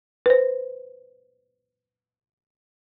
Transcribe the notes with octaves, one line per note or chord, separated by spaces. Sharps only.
B4 C5